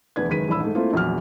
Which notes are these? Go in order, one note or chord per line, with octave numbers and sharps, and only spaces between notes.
F1 E2 D4 B4 G#6
F#1 D#3 G#3 B4 B6 D#7
D#1 E3 D4 B5 E6
G#2 A3
A3 A#3 C4 E4 F4
A#1 E2 F#3 F6